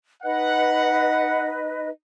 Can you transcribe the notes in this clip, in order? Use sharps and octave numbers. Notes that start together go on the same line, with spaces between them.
D#4 B4 D#5 F#5